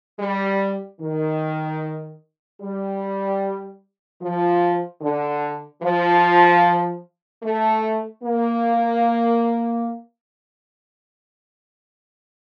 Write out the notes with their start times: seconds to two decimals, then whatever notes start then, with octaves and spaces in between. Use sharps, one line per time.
0.19 G3
1.00 D#3
2.61 G3
4.22 F3
5.02 D3
5.82 F3
7.43 A3
8.23 A#3